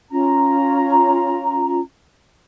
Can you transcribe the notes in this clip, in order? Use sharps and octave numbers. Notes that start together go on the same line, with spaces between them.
C#4 F4 A#5